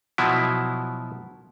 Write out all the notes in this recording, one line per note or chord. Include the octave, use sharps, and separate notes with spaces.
B2 F3 F#3 E4